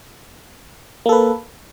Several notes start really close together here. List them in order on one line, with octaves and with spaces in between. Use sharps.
A#3 A4 B4